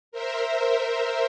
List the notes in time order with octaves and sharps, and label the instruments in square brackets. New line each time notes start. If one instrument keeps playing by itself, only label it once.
[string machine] A#4 C5 E5